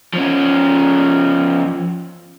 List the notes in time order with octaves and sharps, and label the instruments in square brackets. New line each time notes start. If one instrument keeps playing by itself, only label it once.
[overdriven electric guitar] F3 C#4